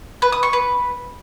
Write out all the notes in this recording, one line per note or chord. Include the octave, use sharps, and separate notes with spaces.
B4
D#6
C#6
B4